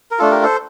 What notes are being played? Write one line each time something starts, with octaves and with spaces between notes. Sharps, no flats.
A#4
A3 D4 F4 A4
G4 A#4
A4 C5